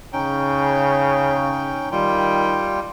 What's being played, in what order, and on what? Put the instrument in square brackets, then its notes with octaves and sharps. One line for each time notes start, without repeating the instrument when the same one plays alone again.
[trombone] C#3 [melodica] C#4 D#4 G5
[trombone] D#3 [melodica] G3 F4 G5